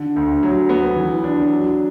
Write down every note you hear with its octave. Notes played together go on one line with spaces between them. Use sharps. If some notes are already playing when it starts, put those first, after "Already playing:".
Already playing: D3
D2
F#3
B3
E3
D4
F#3